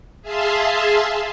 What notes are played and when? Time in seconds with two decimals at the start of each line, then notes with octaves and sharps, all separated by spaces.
0.22 G#4 E5 F5 A5 C6